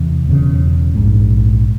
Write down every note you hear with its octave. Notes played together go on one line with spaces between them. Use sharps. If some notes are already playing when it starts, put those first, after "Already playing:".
Already playing: E2 C3
E1 E2 C#3
A#1 G#2